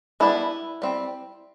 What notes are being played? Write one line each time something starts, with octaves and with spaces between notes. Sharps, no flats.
G3 B3 D4 E4
G3 C4